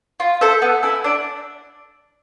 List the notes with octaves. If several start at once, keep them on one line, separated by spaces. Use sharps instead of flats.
F4
A4 C5 E5
B3
E4 A4
D4